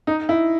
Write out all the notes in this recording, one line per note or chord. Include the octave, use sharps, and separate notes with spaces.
D#4
E4